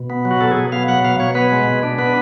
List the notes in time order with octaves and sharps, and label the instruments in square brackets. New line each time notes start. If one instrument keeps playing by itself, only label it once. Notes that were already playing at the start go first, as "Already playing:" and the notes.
Already playing: [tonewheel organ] B2
B3
F#3
F#4
B2 A4
G#4
B2
B3 F5
F#3 F#5
B2 F5
B2 C#5
B3 B4
G#3
B2
D4
B3 B4